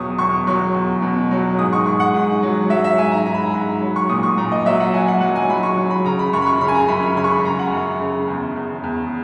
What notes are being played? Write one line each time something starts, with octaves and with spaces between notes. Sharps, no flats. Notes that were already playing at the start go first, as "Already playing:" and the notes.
Already playing: E2 B2 F#3 C#6 D#6
E2 C#6
F#3 C#6
E2
B2
F#3
G#2 D#6
C#6
G#2 C#6
F#5
G#2
F#3
F#3 E5
E5
G#2 G#5
A#5
G#2 A#5
B5
A#5
G#2 B5
F#3
C#6
A#2 D#6
C#6
A#2 A#5
D#5
F#3 E5
F#5
F#3 G#5
F#5
F#3 F#5
G#5
F#3 B5
C#6
F#3
B5
C#3 A#5
B5
F#2 C#6
B5
C#6
C#3 B5
G#5
A#5
F#2 B5
B5
C#3 B5
C#6
B5
F#2 A#5
F#5
F#2
C#3
E2
E2
E2